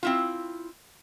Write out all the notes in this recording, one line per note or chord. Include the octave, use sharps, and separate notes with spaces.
C4 E4 F4